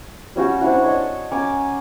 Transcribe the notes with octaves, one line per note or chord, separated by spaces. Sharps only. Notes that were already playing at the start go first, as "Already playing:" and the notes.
G3 C#4 F#4 G4
C4 D4 E4 F#4
C#5 D#5 A5
C#4 G#5 A#5 D6